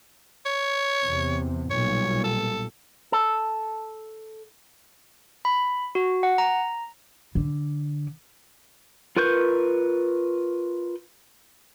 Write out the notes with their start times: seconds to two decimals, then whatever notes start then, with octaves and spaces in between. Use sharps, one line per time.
0.46 C#5
1.04 E2 C3
1.70 B1 A#2 G3 C#5
2.24 A4
3.12 A4
5.45 B5
5.95 F#4
6.23 F#5
6.38 A#5
7.35 D3
9.16 F4 A#4 B4 C#6 G6